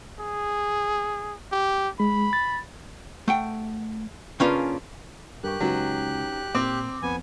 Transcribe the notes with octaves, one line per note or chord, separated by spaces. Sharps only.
G#4
G4
G#3 B5
A6
A3 F#5 G5
C#3 A#3 C#4 D4 F4 B4
G2 G4 A#4 C#6 F#6
C#2 F#3 C#4 D#4 B4
A#2 C4 D6
F2 B3 C4 G#5